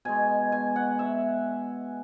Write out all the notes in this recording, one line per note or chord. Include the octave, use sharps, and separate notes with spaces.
B2 G#3 G#5
G#5
F#5
E5